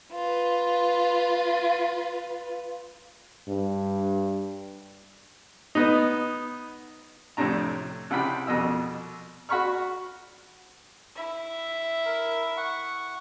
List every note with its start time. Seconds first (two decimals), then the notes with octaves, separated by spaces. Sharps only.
0.12 F4 B4
3.48 G2
5.75 B3 D#4
7.37 F2 A2 C3 D4 A#5
8.10 C#2 C3 E4 F#5 G5 B5
8.47 C2 F2 B2 D#5 E6
9.49 F#4 B5 C#6 F6
11.15 E4 E5
12.06 A#4
12.57 F#5 C#6